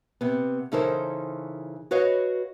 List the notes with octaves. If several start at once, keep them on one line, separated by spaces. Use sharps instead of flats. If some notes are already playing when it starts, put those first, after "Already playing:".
C3 B3
C#3 E3 D#4 A4 A#4 C5
F#4 B4 C#5 D#5 F5